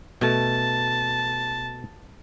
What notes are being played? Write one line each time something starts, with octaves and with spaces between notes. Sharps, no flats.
B2 A3 A5